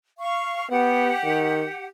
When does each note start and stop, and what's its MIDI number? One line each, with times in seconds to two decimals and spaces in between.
0.19 0.68 77
0.19 0.68 85
0.70 1.11 59
0.70 1.86 67
0.70 1.86 78
1.24 1.65 51